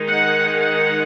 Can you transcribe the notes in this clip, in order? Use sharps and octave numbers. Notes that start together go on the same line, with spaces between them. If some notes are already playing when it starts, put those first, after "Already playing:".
Already playing: D#3 G#3 D#4
F#5
F#5